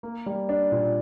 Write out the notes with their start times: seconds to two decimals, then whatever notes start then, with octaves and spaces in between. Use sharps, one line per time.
0.03 A#3
0.26 G3
0.49 D4
0.72 A#2